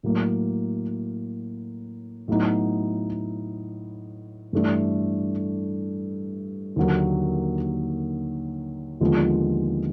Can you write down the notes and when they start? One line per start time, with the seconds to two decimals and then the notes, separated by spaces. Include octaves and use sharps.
0.03 A2 F#3 A#3
2.28 A2 F#3 B3 D#4
4.53 G2 E3 A3 D4
6.76 D#2 D3 F#3 A#3
9.01 D#2 D3 F3 G#3 B3